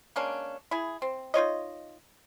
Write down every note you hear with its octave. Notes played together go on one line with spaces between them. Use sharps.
G#3 A#3 C#4 D4
E4 G#4
C4
D#4 F4 C#5 D#5